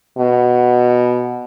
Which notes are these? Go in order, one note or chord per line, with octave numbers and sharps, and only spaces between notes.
B2